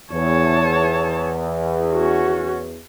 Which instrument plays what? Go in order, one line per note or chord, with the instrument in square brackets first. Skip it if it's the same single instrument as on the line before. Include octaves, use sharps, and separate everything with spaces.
[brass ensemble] E2 [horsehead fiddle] C#5 A5
[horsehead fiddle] C#4 F#4